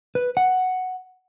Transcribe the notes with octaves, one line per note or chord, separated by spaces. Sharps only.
B4
F#5